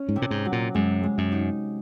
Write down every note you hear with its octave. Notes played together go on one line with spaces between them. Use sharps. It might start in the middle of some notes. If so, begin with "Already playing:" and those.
Already playing: C#4
G#2
C3
A#2
G#2
F#3
A#2
F#2 G#3
G#3
F#2
D#4